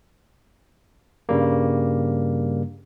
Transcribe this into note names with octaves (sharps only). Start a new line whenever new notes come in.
G2 C#3 G3 A#3